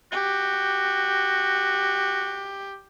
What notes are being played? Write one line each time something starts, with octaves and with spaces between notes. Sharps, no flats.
F#4 G4